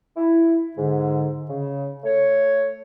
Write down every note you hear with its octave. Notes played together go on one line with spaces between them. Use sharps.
E4
G#2 D3
C#3
A3 C#5